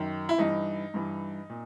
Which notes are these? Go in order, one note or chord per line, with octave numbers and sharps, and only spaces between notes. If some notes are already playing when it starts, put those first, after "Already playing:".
Already playing: F#2 D#3
E4
G2 E3 D#4
G2 E3
A#2